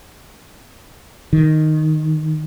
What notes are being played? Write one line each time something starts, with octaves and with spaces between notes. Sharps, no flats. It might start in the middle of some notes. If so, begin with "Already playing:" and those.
D#3